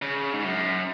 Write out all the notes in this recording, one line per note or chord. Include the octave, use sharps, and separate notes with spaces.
C#3
G#2
F#2